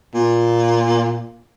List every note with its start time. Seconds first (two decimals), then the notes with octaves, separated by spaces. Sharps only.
0.15 A#2